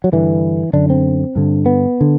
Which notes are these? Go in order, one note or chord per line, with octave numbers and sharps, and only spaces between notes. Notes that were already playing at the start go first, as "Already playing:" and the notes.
F#3
G2 D3 E3
F#2 D3 D4
C4
G2 D3
B3
D3